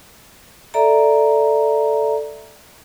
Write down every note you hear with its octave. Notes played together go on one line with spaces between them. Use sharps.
A4 D5 E5 A#5